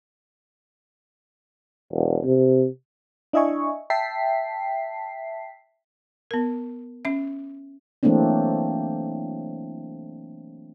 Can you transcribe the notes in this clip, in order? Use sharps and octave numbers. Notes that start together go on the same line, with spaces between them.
E1
C3
D4 E4 D#5 E5 G#5 C#6
E5 G5 A5 B6 C7
B3 A#4
C#4 E5
E3 F#3 A3 A#3 C4 D4